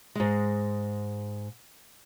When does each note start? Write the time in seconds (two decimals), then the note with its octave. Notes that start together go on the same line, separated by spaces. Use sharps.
0.15 G#2 G#3